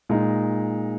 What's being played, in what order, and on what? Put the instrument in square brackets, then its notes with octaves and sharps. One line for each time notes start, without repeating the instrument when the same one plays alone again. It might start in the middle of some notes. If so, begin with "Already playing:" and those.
[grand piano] A#2 G#3 D#4